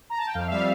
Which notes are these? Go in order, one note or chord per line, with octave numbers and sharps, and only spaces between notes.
A#5
A5
G5
F2 F5
E5
G3 F5